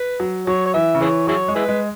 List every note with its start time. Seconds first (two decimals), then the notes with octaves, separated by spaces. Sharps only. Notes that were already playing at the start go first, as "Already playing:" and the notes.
Already playing: B4
0.20 F#3
0.47 F#3 C#5
0.66 C#5
0.74 E3 E5
0.95 C#3
1.01 E3 E4 G#4 C#5
1.27 F#3 E4 G#4 C#5
1.48 G#3
1.55 E4 G#4 B4
1.69 G#3